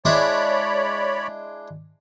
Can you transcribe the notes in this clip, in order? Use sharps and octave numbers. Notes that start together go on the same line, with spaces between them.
G#3 D4 E4 C#5 D5 B5